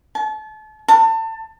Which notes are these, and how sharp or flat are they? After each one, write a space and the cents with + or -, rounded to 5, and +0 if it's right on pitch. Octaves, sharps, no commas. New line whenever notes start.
A5 -35
A5 +30